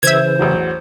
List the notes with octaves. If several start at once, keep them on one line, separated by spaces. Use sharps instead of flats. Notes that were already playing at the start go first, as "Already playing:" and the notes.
C#3 E3 C5 E5 G#6
A1 E2 F#3